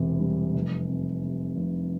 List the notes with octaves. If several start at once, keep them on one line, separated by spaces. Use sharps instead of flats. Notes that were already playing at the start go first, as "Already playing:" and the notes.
Already playing: E1 E2 C3
G3
F1
C3
C3
F1